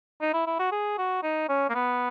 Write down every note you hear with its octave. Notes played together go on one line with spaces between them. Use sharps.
D#4
E4
E4
F#4
G#4
F#4
D#4
C#4
A#3
B3